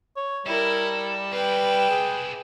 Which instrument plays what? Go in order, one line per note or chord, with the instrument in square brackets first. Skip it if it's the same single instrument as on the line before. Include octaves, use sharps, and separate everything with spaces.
[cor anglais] C#5
[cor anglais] G3 [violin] E4 A#4 [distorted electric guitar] A4
[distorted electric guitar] C4 E4 [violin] B4 G5
[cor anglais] G#4